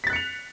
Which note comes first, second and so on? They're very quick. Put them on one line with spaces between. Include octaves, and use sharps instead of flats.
B6 A6 F#6 C#7 F7